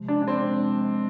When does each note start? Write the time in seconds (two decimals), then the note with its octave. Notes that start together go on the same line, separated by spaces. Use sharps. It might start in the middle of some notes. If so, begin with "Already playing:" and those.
Already playing: C3 F3 G#3
0.08 D4
0.22 D4
0.28 C4